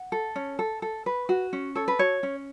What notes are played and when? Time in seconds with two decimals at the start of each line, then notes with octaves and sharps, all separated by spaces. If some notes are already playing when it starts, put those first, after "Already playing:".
Already playing: F#5
0.12 A4
0.36 C#4
0.59 A4
0.82 A4
1.06 B4
1.29 F#4
1.53 C#4
1.75 A4 C#5
1.88 B4
1.99 F#4 C#5
2.23 C#4